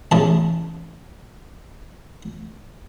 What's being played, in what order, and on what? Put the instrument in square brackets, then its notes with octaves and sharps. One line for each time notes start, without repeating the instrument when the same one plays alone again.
[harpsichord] A1 C#3 A5